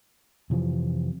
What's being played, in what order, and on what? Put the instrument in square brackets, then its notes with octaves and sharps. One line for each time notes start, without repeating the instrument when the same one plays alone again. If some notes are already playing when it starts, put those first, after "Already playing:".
[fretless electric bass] F2 C3 E3 F3